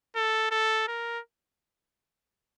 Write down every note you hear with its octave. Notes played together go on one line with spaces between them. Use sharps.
A4
A4
A#4